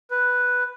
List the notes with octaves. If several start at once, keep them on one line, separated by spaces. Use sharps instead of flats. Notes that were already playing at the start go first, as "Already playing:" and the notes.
B4